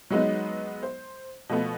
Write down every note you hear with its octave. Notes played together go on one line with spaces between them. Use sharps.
F#3 G#3 B3 D#4
C5
B2 F3 A3 B3